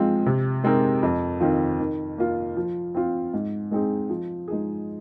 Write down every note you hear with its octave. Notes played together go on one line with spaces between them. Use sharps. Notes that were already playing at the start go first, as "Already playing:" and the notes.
Already playing: G#2 F3 G#3 C4 F4
C3
G#3 C4 D#4 A#4
F2
D#3 C4 F4
D#3
A#3 F4
F3
C4 F4
G#2
G#3 C4 D#4 G#4
F3
G#3 D#4 G#4